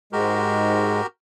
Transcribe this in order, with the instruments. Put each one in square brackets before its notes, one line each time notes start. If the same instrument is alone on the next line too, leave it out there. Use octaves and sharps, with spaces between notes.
[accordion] G#2 G#3 [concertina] F#4 G4 A#4